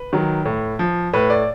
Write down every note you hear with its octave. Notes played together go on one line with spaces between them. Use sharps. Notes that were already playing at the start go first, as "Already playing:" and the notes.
Already playing: B4
D#3 F#3
A2
F3
A2 B4
D5